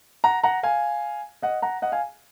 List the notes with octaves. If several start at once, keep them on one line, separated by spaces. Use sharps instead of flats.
F#5 A#5
F#5 A#5
F5 G#5
D#5 F#5
F#5 A#5
D#5 F#5
F5 G#5